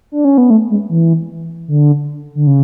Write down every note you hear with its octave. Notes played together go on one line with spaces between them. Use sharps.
D4
C#4
B3
A3
G#3
E3
D3
D3
C#3